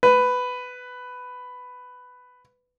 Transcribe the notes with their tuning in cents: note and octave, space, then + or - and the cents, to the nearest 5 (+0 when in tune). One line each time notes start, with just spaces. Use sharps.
B4 +10